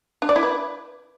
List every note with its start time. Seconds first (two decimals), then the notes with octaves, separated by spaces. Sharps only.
0.22 D4
0.29 D5
0.36 E4
0.43 B4